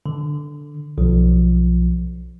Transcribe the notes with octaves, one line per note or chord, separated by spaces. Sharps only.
D3
B1 F3